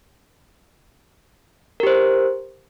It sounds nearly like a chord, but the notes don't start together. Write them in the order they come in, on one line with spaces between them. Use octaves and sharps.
A#4 G4 C5